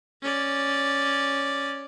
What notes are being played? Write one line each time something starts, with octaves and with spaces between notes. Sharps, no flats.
C#4 D5